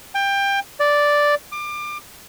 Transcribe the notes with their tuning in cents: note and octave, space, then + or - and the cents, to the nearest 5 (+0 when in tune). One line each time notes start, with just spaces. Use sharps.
G5 +20
D5 -5
D6 +30